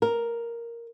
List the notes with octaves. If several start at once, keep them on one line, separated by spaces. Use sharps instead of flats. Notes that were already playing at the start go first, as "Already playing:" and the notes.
A#4